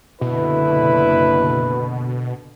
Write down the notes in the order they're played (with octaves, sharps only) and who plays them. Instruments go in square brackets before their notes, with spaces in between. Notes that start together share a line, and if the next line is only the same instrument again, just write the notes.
[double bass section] F#1 D3 [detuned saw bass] B2 [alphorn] E4 [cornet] B4